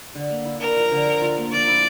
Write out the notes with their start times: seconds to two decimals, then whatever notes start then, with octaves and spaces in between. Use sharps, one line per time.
0.15 D3
0.30 A#3
0.45 E4
0.60 D4 A#4
0.76 F3
0.92 D3
1.07 A4
1.22 F4
1.37 A#3
1.52 F3 D5
1.67 E4